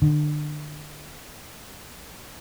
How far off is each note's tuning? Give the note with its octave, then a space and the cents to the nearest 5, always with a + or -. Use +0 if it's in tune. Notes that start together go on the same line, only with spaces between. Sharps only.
D3 +30